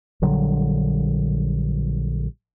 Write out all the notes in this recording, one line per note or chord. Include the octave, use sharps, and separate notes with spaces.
A#1 D3 F#3 G3